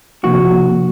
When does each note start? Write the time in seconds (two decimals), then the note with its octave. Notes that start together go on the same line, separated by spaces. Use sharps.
0.23 C3 F3 A#3 D4 F#4